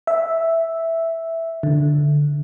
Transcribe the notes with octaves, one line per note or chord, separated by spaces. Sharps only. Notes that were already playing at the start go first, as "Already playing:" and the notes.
E5
D3